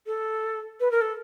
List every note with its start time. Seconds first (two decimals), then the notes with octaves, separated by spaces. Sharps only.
0.07 A4
0.80 B4
0.91 A#4
1.01 A4